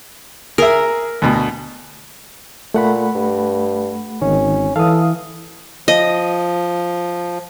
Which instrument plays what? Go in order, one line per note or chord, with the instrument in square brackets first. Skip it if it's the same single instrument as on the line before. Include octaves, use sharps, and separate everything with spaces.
[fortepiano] G#4 E5 [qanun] A#4
[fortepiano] D2 B2
[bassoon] A#2 [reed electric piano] A3 F#5 B5
[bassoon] G2
[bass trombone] G#1 [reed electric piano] D#3 [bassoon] C#4
[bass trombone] E3 [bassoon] A4 [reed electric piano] F5 D#6
[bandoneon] F3 [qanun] D#5